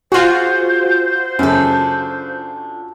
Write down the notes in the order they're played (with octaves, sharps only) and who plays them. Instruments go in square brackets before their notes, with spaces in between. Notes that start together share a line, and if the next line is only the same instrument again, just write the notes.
[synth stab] F4 F#4 [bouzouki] G#4 F#5 [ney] C5
[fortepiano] F#2 C#3 [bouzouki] D4 A4